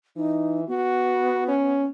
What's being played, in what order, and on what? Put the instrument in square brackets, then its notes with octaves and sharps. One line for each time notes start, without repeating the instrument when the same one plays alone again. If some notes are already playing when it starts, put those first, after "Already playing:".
[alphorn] E3 [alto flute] D#4
[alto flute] B3 [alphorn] F#4
[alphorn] C#4